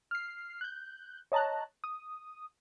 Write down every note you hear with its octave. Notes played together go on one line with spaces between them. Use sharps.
F6 C7
F#6 G6
C#5 D#5 A5 A#5 F#6
D#6